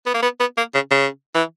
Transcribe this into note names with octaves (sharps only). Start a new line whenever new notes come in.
B3
A#3
B3
B3
A#3
C#3
C#3
E3